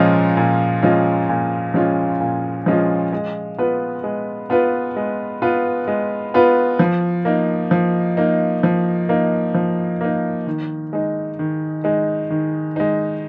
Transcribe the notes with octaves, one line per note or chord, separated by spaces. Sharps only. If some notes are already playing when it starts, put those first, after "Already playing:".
Already playing: A#2 F3 G#3 C#4 F4
A#2
F3 G#3 C#4 F4
A#2
F3 G#3 C#4 F4
A#2
F3 G#3 C#4 F4
G#3
B3 F4 B4
G#3
B3 F4 B4
G#3
B3 F4 B4
G#3
B3 F4 B4
F3
A#3 D#4
F3
A#3 D#4
F3
A#3 D#4
F3
A#3 D#4
D#3
G#3 D#4
D#3
G#3 D#4
D#3
G#3 D#4